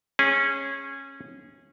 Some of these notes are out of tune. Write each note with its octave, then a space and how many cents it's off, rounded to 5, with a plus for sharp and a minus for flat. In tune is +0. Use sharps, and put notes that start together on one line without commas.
C#4 -15 G#4 -15